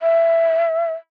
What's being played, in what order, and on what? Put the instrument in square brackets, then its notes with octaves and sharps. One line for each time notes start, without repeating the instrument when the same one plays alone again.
[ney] E5